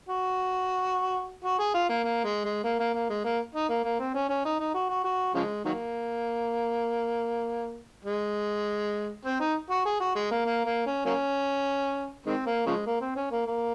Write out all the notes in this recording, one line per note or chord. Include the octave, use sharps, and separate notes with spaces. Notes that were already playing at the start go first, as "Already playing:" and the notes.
F#4
F#4
G#4
F4
A#3
A#3
G#3
G#3
A#3
A#3
A#3
G#3
A#3
D#4
A#3
A#3
C4
C#4
C#4
D#4
D#4
F#4
F#4
F#4
C#3 F3 G#3
D#3 F#3 A#3
G#3
C4
D#4
F#4
G#4
F#4
G#3
A#3
A#3
A#3
C#4
F#3 A#3 C#4
D#3 G#3 C4
A#3
C#3 F3 G#3
A#3
C4
C#4
A#3
A#3